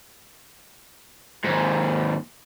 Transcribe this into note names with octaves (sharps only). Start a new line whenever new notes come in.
D#2 G#2